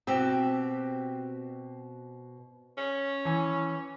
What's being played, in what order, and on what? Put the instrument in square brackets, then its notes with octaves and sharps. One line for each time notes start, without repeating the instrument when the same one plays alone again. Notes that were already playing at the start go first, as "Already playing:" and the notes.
[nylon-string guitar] B2 C4 [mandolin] F#4 G4 E6
[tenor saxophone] C#4
[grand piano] E3 G#5